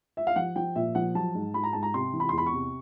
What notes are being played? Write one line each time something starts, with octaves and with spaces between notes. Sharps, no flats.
E5
F5
F3 F#5
F3 G5
A#2 E5
F3 F#5
F#3 A5
G#2
G#2 B5
A#5
G#2 A5
A#5
C3 C6
E3
B5
C6
E2
B5
C#6
C3